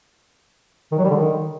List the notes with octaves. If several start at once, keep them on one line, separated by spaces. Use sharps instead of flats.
D#3
F#3
G3
D3
D#3